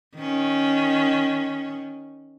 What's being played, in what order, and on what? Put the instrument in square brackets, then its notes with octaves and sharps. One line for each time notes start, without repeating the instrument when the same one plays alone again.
[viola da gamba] D#3 C#4